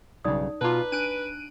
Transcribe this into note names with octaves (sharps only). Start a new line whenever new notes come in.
B1 G2 C#3 D#4 D5 D#6
B2 F4 B4 A5 A#5 D6
D4 F#6 D7 D#7